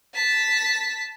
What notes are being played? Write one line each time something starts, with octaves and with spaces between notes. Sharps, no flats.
A5 B6